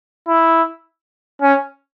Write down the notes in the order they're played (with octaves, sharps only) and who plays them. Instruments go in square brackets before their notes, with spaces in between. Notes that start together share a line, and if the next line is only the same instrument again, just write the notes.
[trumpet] E4
C#4